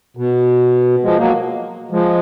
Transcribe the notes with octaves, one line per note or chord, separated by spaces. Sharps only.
B2
F3 G#3
F#3 A#3
F3 G#3